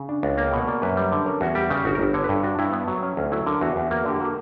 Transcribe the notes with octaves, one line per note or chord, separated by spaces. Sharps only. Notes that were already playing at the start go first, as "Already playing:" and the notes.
Already playing: C#3
D4
C#2
A#3 A#5
G5
B2 F#5
A#3 D5
F#2 B4
G3
D3
C#4 A#4
E2 F#4
G3 G4
C#3 G4
G1 F#4
A#4
G1
D3 C#5
B4
G2
D4 F#4
G2 E4
B3
F#3
C#4
D2
F#3 E4
D3 A#4
E2 F#4
E2
A#3 F#4
D3 G4
A#3 F#4